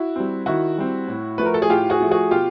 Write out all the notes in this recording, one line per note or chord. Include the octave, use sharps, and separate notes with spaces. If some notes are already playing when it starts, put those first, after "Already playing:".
Already playing: E4 F#4
G3 C4
D#3 E4 F#4
G3 C4
A2
F3 A3 B4
A#4
A4
G#4
A2 F4 G4
F#4 G#4
F3 A3
F#4 G#4
B2 F4 G4